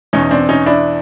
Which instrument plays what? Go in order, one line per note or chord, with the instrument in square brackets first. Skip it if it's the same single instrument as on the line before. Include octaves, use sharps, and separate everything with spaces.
[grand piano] E2 B2 C#4 D#4
C4 D4
C#4 D#4
D4 E4